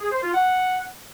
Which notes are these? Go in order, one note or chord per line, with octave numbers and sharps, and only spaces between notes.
G#4
C5
F4
F#5